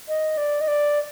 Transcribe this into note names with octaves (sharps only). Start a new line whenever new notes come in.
D#5
D5
D#5
D5